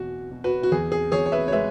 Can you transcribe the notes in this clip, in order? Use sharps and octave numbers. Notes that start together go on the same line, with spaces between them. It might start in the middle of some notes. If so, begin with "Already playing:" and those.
Already playing: E2 B2 F#4
B2
F#4 B4
F#4
E2 G#4
G#4
E2 G#4 C#5
C#5
B4 E5
C#5
G#3 B4 E5